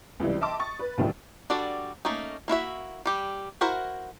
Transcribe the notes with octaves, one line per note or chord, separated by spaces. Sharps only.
C#2 C3 E3 G3
D#5 E5 G5 A5 C6 D6
C#6 D#6 A6
B4
A1 D2 A2 D#3 F3 G3
G3 D4 F#4 A4 D5
A3 A#3 C#4 D#4
A#3 E4 F#4 E5
G3 G4
E4 F#4 A#4 C5 F#5